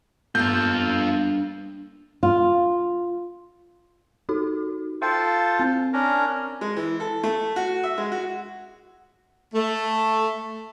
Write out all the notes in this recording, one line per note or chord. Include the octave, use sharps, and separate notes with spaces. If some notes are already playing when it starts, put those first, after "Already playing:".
G2 A#3 B3 F4 A4 G6 A6
F4
D#4 F#4 A4
F4 A4 C5 F5 G5 C6
C4
C#4 D4 A#4
G#3
E3
A4
A3
F#4
E5
G#3
F#4
A3